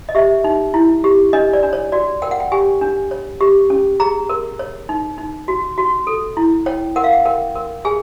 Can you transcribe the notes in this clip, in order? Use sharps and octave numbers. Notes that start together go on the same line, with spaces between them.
D#5
G4 E5
D#4
E4
G4
D4 D#5
D5
D4
C#5
F#4 D5
A#4 G5
F#5
G5
G4 G#5
D4
C#5
G4
C#4
G#4 A#5
A#4
C#5
D#4
D#4
F#4
F#4
A4
E4
C#5 G5
A#4 F#5
F5
F#5
A#4 G5
A#4
G#4 G#5